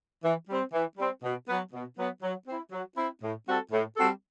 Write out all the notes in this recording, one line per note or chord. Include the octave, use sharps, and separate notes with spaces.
E3
G3 C4
E3
G3 C4
B2
F#3 B3
B2
F#3 B3
F#3
C4 E4
F#3
C4 E4
A2
G3 C4 F#4 A4
A2
G3 C4 F#4 A4